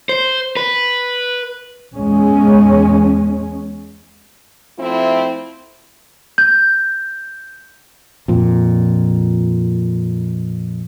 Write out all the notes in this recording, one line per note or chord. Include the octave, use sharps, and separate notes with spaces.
C5
B4
E2 G#3 C#4
F3 A3 C4 E4
G6
F2 A#2